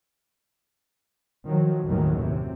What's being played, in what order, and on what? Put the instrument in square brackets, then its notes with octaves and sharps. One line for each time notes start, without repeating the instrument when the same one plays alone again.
[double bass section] D#3 F3 F#3
F#1 D#2 A2 D#3 E3 F#3
C3